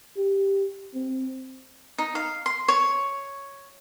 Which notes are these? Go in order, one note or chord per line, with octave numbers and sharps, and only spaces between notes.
G4
C4
D#4
F5
C6
C#5